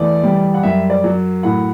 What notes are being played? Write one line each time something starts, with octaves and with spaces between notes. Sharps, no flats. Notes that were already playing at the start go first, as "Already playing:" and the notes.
Already playing: E2 A3 D5
G3
F#5
F#2 E5
D5
F#3
A2 F#5